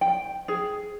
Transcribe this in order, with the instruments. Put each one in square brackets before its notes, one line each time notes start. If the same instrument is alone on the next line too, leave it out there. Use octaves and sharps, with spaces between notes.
[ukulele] G5
G#4